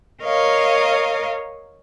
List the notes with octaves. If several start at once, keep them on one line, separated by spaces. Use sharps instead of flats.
A#4 C#5 D#5 F5